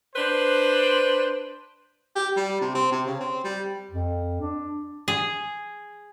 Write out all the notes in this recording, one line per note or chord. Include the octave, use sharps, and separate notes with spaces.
D4 B4 C5
G4
G3
C3
C4
C3
C#3
C4
G3
F2
D4
G#4